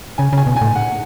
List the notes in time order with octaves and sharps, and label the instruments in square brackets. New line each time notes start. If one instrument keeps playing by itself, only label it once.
[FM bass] C#3 [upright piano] G#5
[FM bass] C#3 [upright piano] G#5
[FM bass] B2
[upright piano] G#5
[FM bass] A2
[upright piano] F#5